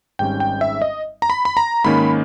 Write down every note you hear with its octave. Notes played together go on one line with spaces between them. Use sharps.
G#1 G#2 G3 C#4 G5
G5
E5
D#5
A#5
B5
B5
A#5
G#2 D#3 A#3 C#4 B5